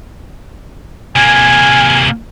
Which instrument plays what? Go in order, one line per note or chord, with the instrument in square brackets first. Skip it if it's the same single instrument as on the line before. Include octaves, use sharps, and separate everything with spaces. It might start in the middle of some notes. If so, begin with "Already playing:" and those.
[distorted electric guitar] C3 A#3 [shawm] G#5